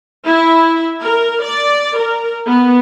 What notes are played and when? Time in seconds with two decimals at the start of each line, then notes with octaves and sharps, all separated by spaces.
0.25 E4
1.03 A#4
1.44 D5
1.99 A#4
2.47 B3